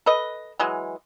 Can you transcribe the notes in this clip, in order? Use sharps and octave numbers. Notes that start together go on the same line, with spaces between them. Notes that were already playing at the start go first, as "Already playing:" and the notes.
A4 B4 D#5
E3 F#3 G#3